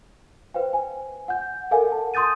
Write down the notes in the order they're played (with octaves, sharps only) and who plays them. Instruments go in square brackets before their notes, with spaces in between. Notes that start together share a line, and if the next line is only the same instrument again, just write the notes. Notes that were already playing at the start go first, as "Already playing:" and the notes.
[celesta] B4 C5 F5 G5
G#5
F#5 G6
A4 A#4 D#5 F5 F#5 G#5
A5
C6 D#6 G6 A6 D#7